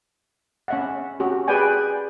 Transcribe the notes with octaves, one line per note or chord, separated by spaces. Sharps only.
C#4 E5 F#5
C#4 F#4 G4
G#4 B4 D5 G5 G#5